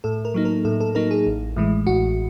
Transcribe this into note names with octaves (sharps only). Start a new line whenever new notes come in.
A2 A4
A#4
F#3 A#3 D#4
A#4
A2 A4
A4
F#3 A#3 D#4 A#4
G#4
A1
A2 E3 G#3
A1 F#4